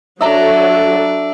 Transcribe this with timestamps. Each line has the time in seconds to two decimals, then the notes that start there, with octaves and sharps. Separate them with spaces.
0.21 F#3 D4 F#4 A4 E5 A#5